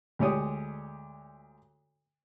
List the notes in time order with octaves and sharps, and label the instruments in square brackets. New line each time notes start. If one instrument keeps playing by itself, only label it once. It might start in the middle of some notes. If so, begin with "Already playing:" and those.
[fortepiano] D2 G#3 G4 C#5 D5 D#6